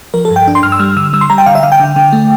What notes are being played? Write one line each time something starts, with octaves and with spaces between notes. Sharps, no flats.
F3 A#4
A4
G2
G5
D4
C6
G2 F6
E6
G3 F6
D3 E6
G3 E6
C6
G3 A#5
G5
D3 F5
E5
D3 F5
G5
D3
D3
A3